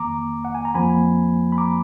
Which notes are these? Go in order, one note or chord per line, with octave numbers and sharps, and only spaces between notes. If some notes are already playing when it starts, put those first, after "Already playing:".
Already playing: F2 D#3 A#3 A#5 D6
F#5
G#5
A#5
F2 F3 A#3 G#5 B5
B5
A#5 D6